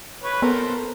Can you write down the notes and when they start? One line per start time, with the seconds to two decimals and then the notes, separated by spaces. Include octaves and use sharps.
0.24 B4 C#5
0.42 B3 A4 A#4 C5